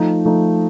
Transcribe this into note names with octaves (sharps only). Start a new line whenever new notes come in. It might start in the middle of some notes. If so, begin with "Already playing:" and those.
Already playing: F3 A3 D#4
F3 A3 D#4